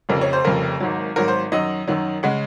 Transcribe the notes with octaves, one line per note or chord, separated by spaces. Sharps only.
F1 F2 C#3 A#4
C#5
C5
F1 F2 C#3 A#4
G#1 G#2 F#3
G#1 G#2 F#3 A#4
C5
F#2 D#3 F#3 D#5
F#2 D#3 F#3
C#3 G#3 F#5